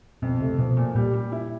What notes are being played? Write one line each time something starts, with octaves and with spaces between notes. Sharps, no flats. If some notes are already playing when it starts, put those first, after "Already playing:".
F2 B2
C3 A3
B2 F3
A#2
A#2 G3
G3
E4